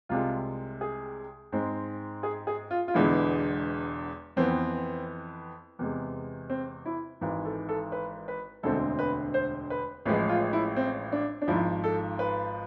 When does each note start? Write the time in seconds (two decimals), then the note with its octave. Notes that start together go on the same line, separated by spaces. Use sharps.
0.09 C2 C3 G#3 F4
0.81 G#4
1.52 G#2 G#3 C4
2.23 G#4
2.47 G#4
2.71 F4
2.88 F4
2.94 E1 E2 D3 G#3 B3 E4
4.37 F2 E3 B3 C4
5.79 E2 C3 G#3
6.50 C4
6.86 E4
7.21 G#1 G#2 E3
7.45 A4
7.69 A4
7.92 B4
8.28 B4
8.63 E1 D2 D3 G#3 C4 A4
8.99 B4
9.34 C5
9.70 B4
10.05 A1 A2 F3 G#3 B4
10.29 F4
10.53 E4
10.76 C4
11.12 D4
11.42 D4
11.48 G#1 G#2 F3 E4
11.84 A4
12.19 B4